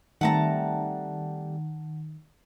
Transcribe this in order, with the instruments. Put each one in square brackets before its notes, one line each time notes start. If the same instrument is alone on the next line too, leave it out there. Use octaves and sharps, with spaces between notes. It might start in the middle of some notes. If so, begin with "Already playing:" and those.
[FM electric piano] D#3 [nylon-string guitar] G3 A3 C4 [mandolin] F#5 A5 A#5